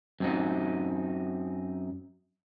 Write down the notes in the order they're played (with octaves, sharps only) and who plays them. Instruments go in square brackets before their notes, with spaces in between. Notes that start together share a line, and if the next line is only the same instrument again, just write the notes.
[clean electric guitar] F#2 C4 D#4